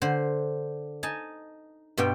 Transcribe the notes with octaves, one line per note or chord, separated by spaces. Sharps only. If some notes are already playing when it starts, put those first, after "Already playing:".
D3 C5
D#4 G#5 A5
G2 B2 F4 G5